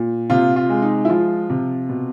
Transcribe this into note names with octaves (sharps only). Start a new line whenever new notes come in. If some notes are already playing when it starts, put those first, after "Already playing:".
Already playing: A#2
C3 F4
F4
G#3
D#4
E4
F3 F4
C3
B2